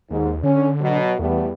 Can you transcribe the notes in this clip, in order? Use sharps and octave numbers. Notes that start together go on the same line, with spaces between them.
D#2 G#2
D3 C#4
B2 F#3
E2 G3 A3 B3